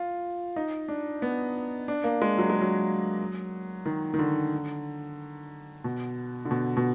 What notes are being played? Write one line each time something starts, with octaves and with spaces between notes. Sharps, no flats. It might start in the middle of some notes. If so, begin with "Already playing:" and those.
Already playing: F4
D#4
D4
B3
D4
A#3
G#3
F#3
G#3
F#3
D#3
D#3
D3
B2
D3
B2
B2